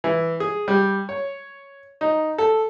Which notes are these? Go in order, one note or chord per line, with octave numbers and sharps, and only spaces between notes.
E3
G#4
G3
C#5
D#4
A4